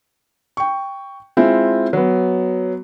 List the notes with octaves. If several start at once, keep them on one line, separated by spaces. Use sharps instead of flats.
G5 C#6
G#3 C4 E4 F4
F#3 B3